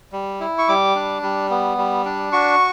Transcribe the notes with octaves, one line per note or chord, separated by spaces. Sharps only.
G3
E4
C#6
G3 D6
D4
G3
B3
G3
D4
F#4 C#6